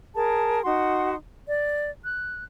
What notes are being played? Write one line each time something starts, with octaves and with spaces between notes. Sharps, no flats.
G#4 A#4 A5
D#4 F#4 F#5 C6
D5
F#6